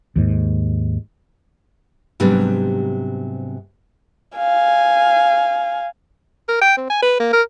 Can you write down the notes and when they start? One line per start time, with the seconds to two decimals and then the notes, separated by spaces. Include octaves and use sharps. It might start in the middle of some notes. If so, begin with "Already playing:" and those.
0.16 D#2 G#2
2.20 G#2 C3 F#3 G3 B3 D4
4.37 F5 G#5
6.49 A#4
6.61 G5
6.77 C4
6.90 G#5
7.02 B4
7.20 A#3
7.33 A#4